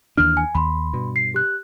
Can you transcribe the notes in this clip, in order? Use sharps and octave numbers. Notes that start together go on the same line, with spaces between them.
D#2 E3 D4 F6
G#5
D#2 B5 C6
G2 B2
C7
G4 F#6